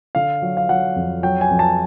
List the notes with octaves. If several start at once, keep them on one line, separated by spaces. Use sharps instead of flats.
D3 F5
F#3
F5
F#3 F#5
F2
F#3 G5
G#5
F2
A5